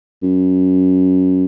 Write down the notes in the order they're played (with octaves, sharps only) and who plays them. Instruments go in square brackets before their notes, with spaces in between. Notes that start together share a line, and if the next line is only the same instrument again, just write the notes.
[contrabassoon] F#2